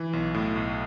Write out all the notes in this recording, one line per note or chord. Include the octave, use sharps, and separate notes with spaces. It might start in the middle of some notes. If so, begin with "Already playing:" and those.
Already playing: E3
B1
A2
B1